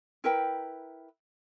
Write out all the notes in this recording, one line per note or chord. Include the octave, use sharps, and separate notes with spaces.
E4 A#4 B4 G5